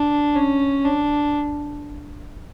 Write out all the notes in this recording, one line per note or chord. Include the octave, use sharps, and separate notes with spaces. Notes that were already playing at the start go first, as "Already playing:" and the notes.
Already playing: D4
C#4
D4